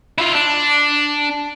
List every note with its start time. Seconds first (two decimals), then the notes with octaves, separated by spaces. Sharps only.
0.18 E4 F4
0.34 D4